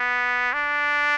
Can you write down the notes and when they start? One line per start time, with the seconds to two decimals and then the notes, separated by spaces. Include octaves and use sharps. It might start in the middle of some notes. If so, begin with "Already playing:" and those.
Already playing: B3
0.53 D4